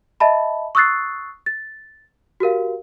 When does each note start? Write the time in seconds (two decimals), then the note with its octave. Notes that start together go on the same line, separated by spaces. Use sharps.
0.20 D#5 E5 A5 B5
0.75 C#6 D#6 E6 F#6 A6 C7
1.46 A6
2.40 F#4 G4 A#4 F5